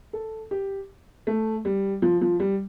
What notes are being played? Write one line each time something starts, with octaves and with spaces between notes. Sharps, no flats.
A4
G4
A3
G3
F3
F3
G3